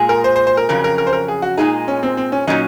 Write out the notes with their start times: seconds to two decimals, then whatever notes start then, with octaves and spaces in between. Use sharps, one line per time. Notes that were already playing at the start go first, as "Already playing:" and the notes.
Already playing: A#2 G#3 G#4
0.09 A#4
0.24 C5
0.36 C5
0.47 C5
0.57 A#4
0.69 F2 C#3 F#3 C#4 A#4
0.84 A#4
0.98 A#4
1.07 C5
1.13 A#4
1.28 G#4
1.42 F#4
1.57 A#2 G#3 D#4 G#4
1.88 C#4
2.03 C4
2.17 C4
2.32 C#4
2.47 A#2 F#3 C#4 D#4